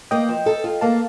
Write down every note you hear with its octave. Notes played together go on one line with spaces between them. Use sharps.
A#3 D#5 G5
F3
A4
F4
A#3 F5 A5